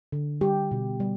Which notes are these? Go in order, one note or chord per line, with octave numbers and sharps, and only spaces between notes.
D3
G3 G4
B2
G3